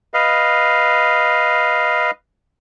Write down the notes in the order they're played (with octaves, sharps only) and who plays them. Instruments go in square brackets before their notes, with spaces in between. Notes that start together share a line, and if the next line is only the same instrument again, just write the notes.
[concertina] B4 D#5 F5